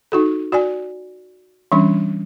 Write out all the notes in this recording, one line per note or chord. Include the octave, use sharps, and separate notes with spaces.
D#4 F#4 A4
F#4 D5 G#5
E3 G3 C#4 D4